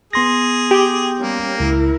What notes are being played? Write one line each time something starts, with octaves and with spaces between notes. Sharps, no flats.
B3 G#4 C6 A#6
G4 G6
G3 A#3 C#4
C#2 E4 A#4